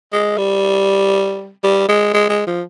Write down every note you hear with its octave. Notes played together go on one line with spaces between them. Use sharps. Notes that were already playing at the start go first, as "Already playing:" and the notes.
G#3
G3
G3
G#3
G#3
G#3
F3